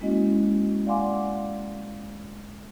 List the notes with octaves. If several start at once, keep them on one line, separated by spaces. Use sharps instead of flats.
G#3 A#3 C#4 E4 F#4 D#5
D5 F5 F#5 G#5 C6 D6